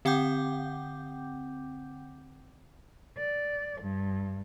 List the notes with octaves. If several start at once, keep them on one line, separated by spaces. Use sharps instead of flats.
D3 C4 F#5 G5 D6 G6
D5
G2